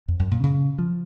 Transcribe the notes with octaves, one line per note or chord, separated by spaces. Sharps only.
F2
F#2
A#2
C#3
F3